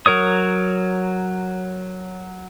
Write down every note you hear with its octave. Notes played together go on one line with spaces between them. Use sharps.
F#3 A#4 C#5 D#6